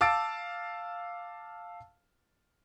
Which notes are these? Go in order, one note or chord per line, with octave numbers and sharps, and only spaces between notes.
F5 A5 D6 E6 A6 D7